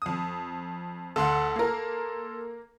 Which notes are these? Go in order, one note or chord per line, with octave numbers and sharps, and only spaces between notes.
F2 D#6
D2 A4 F#5 C6
A#3 A#4